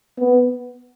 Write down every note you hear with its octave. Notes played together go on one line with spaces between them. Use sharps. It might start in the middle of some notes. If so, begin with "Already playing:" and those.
B3